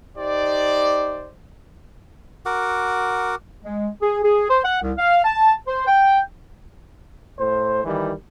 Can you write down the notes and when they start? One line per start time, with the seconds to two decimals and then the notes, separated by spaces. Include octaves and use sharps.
0.17 D#4 G4 C5 D5
2.46 F#4 A#4 F#5 D6
3.64 G#3
4.02 G#4
4.23 G#4
4.50 C5
4.64 F#5
4.82 C2
4.98 F5
5.24 A5
5.67 C5
5.87 G5
7.38 A2 C5
7.85 D#3 E3 G3